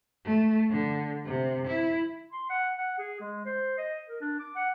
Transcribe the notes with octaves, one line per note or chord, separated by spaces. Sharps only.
A3
D3
C3
E4
C6
F#5
F#5
G#4
G#3
C5
D#5
A#4
D4
D6
F#5